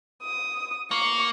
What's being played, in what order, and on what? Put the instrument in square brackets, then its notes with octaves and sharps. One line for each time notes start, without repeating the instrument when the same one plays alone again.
[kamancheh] D#6
[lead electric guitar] A#3 [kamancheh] C#6